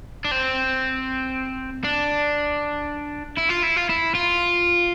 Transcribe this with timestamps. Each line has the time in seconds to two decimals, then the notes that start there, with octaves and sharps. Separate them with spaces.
0.25 D4
0.31 C4
1.84 D4
3.38 E4
3.50 F4
3.63 E4
3.77 F4
3.90 E4
4.15 F4